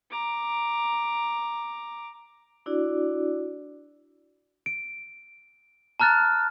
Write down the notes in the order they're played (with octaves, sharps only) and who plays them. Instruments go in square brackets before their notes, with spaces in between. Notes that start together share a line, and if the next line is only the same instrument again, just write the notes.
[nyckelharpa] A#5 D6
[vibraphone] D4 E4 F#4 D5
[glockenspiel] D7
A5 A#5 F6 F#6 A6